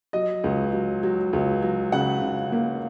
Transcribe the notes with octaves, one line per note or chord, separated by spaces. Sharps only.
F#3 D#5
C#2
F#3
F#3
C#2
F#3
C#3 F#5
C#3
A#3